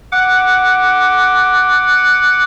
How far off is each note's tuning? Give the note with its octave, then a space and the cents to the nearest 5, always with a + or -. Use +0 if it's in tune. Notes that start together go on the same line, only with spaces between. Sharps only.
F#5 +0 D6 +0